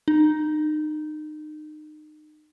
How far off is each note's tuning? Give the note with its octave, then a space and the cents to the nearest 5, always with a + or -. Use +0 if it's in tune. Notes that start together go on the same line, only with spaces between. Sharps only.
D#4 -30